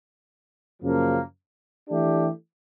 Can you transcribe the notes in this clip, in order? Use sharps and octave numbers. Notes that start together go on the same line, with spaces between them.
F#2 C#3 F3 A#3
E3 A3 D4 G4